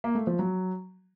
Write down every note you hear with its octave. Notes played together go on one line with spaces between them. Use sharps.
A#3
A3
F3
F#3